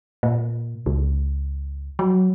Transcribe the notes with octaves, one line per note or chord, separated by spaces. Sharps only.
A#2
C#2
F#3